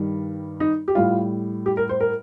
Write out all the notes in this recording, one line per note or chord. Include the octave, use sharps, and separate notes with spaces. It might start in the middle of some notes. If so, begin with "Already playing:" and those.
Already playing: G2 D#3 G3
D#4
G4
A2 G3 F4
G4
A#4
C5
A#4